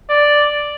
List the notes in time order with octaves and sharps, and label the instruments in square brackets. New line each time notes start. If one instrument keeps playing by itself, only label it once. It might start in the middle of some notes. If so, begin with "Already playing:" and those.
[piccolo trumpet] D5